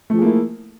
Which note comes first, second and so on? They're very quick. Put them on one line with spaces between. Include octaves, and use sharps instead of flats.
A3 F3 G#4 A#3 E4